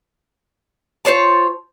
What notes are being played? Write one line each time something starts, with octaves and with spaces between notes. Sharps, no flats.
F4 C5 C#5 A5